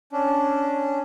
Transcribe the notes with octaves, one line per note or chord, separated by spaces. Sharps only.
C#4 D4